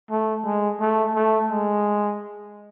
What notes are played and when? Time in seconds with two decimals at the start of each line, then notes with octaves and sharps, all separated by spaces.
0.10 A3
0.45 G#3
0.80 A3
1.15 A3
1.50 G#3